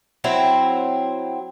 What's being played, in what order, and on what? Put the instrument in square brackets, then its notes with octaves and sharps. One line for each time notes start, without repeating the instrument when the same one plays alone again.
[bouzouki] F#3 C4 E4